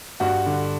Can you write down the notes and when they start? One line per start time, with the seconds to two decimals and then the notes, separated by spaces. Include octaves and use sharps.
0.20 G2 F#4
0.46 D3